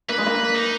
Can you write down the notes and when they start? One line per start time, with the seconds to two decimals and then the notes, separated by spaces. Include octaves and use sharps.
0.09 A#3 B4
0.18 G#3
0.26 A#3
0.55 D#4